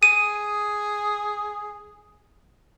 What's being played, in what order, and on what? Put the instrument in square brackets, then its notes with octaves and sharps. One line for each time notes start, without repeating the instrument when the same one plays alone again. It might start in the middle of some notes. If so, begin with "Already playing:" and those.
[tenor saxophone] G#4 [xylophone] D#7